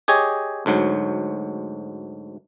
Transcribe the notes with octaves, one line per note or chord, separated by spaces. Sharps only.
G4 G#4 C#5 D#5 G#5
D2 G#2 F#3